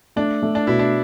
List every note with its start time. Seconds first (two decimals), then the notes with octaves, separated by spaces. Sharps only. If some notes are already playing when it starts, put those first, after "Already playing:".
0.16 A3 D4
0.43 A3
0.55 D4
0.67 B2 E4
0.79 D4